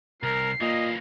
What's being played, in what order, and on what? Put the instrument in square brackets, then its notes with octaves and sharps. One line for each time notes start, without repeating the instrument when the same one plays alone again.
[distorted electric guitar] C2 [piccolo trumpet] A#4 [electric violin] C7
[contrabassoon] A#2 [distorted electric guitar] E3 A#3 [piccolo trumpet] D#5